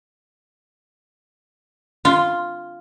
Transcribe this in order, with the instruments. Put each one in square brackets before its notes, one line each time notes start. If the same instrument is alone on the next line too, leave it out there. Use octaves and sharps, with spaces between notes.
[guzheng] F4